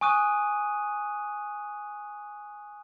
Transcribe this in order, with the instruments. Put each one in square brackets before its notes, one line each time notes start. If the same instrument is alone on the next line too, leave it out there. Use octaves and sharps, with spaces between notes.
[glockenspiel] G#5 C#6 D#6 F#6 D#7